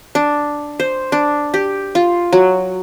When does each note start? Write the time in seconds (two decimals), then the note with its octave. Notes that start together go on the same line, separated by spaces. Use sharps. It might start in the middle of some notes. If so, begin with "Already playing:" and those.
0.15 D4
0.80 C5
1.12 D4
1.54 G4
1.95 F4
2.33 F#3